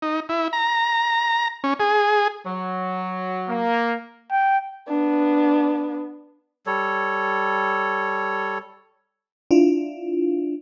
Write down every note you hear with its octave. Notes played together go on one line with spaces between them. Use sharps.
D#4
E4
A#5
C#4
G#4
F#3
A#3
G5
B3 D4
G3 A4 C#5
D4 E4 F4